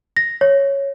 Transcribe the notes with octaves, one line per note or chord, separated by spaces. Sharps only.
A#6
C#5